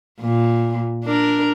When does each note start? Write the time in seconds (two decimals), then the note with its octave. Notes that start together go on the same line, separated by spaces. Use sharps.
0.20 A#2
1.04 D4 A#4